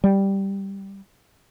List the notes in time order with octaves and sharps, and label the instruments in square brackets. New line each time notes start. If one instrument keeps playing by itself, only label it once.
[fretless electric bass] G3